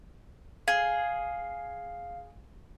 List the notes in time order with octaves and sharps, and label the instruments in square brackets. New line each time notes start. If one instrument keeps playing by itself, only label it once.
[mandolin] G#4 [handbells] F5